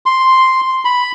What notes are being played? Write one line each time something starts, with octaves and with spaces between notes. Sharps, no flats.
C6
B5